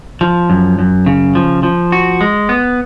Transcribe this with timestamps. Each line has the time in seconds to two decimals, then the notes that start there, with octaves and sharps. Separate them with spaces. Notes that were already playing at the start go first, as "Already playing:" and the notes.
0.21 F3
0.50 F#2
0.79 F#2
1.06 C#3
1.35 F3
1.63 F3
1.92 F#4
2.21 G#3
2.49 B3